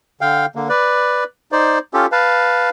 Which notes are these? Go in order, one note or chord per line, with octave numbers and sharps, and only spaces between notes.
D3 F5 G5
D3 A#3
B4 D5
D#4 C5 D5
C#4 F4 G4 A4
B4 F5 A5